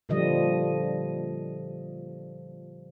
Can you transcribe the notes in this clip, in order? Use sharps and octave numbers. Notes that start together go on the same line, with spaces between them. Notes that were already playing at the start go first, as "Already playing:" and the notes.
A#2 D3 F3 G3 D#5